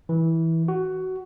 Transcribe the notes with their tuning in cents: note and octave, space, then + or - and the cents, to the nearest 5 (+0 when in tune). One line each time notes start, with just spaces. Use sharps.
E3 -15
F#4 +15